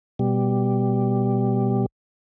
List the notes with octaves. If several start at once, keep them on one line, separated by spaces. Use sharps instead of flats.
B2 G3